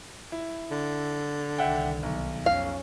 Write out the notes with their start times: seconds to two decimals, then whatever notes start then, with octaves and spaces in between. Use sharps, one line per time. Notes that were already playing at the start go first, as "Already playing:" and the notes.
0.32 E4
0.71 D3
1.58 C2 D#3 E5 F#5 G5
2.03 B1
2.46 F2 C#4 F5